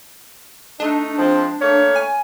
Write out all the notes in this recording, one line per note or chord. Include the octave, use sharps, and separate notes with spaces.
A3 D4 D#4
F3 G#3 C4
A3 A#3 C#5
G#5